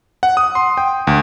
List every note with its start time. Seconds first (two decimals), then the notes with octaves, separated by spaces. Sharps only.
0.23 F#5
0.37 D#6
0.55 C6
0.77 G5
1.07 D2